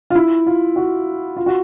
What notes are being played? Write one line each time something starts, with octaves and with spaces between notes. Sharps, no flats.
F4
E4
F4
F#4
F4
F#4